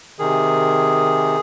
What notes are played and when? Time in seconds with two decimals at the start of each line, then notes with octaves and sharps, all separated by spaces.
0.19 C3 D#3 G#4